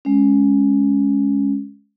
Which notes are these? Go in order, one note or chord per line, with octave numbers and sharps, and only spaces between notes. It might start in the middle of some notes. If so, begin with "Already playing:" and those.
G#3 C#4